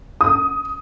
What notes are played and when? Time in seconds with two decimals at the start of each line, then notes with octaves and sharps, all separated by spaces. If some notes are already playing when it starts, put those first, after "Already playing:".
0.21 D#6